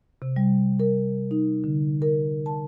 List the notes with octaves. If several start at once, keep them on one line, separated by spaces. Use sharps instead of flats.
C3
G3
A#4
D#4
D3
A#4
A5